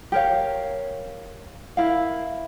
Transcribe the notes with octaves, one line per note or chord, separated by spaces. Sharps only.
G4 A#4 C#5 F5
E4 A#4 F5